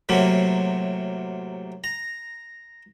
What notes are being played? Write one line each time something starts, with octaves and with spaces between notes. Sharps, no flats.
A2 C3 F#3 A#3
A#5